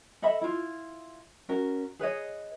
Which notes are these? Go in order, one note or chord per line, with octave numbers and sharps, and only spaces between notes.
A4 D#5 E5 B5
E4 F4
C#4 F#4 A#4
G#4 B4 C#5 D#5